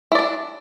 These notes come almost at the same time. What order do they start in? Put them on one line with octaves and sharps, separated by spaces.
E4 D5 D4